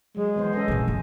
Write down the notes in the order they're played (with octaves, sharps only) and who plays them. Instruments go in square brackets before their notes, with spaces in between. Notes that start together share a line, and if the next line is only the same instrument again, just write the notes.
[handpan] F#3 [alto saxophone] G#3
[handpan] E3 B3 C5
C#4 A4 D#5
[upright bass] F#2 A#2
F3